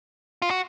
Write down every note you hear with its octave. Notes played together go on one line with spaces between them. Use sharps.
F4
F#4